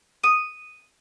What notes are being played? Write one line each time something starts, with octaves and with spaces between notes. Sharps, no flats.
D#6